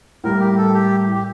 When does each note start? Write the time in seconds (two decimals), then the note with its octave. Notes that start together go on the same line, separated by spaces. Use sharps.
0.24 A2 G3 A#3 A#4
0.41 G4
0.57 A4
0.74 G4
1.15 G4